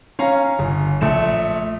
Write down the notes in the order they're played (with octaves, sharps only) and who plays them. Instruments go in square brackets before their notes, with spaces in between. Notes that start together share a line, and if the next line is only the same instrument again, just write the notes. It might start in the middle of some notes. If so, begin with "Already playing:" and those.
[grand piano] C#4 C#5 F5 A#5
G1
A#1 A3 E7